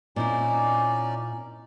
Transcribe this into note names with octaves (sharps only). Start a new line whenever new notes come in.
A#2 C4 C#4 D#4 E4 D5